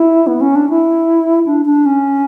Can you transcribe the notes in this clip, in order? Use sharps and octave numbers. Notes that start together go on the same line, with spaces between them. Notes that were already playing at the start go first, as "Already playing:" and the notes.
Already playing: E4
B3
C#4
D4
E4
D4
D4
C#4